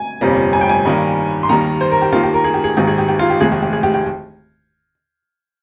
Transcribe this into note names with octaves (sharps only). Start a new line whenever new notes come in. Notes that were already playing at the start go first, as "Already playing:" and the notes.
Already playing: G#5
G1 F2 C3 G3 A#3
G#5
G5
G#5
G2 D#3 G3 A#3
C6
D#2 D#3 G3 A#3 A#5
C5
A#4
G4
D#2 D#3 A#3 F4
G4
A#4
G#4
G4
G#4
G#1 G#2 D#3 A#3 G4
G#4
G4
G4
F4
G4
F1 D#2 D#3 G#3 G#4
G4
G4
G#4
G4
G4